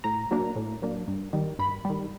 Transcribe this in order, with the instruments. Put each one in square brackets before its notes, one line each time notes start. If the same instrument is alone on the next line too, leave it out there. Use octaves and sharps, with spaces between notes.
[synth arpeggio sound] A2 A#5
F#3 A#3 D4
A2
F#3 A#3 D4
G2
D#3 G3
G2 B5
D#3 G3